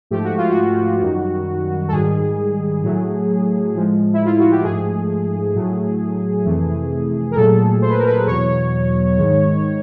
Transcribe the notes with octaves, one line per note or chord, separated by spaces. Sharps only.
G#2 F3 A3 G4
F#4
F4
F#4
F#2 D#3 G3
A4
G#2 D#3 G3 G#4
A2 F#3 A3
A2 F3 G#3
E4
F4
F#4
G4
G#2 F3 A3 G#4
A2 F#3 A3
F2 C3 E3 A3
A#4
A#2 F#3 A3 A4
C5
B4
A#4
B4
E2 B2 F#3 C#5
G#2 D#3 G#3